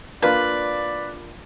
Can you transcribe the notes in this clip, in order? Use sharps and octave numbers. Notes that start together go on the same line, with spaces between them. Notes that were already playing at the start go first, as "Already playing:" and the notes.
A#3 D4 F4 B4 D5